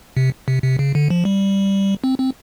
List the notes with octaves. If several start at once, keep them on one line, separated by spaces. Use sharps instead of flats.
C3
C3
C3
C#3
D3
F3
G3
C4
C4